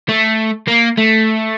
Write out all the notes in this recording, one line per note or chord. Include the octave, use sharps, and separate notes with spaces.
A3
A#3
A3